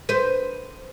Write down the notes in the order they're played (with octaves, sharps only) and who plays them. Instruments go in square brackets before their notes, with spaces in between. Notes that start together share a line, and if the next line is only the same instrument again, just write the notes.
[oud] B4 C5